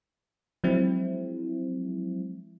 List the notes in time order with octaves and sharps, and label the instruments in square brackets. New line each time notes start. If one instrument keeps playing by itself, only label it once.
[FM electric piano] F3 F#3 G#3 C4 E4